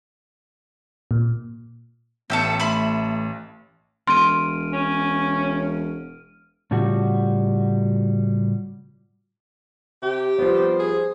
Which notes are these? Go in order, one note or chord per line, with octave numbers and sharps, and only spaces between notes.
A#2
A1 B3 A4 E5 G5 C#7
A3 E5 B5 C6
E1 C6 F6 D7 D#7
C#4
A2 C#3 F3 G3 F#4
C3 G4
F3 G3 B3 C5
G#4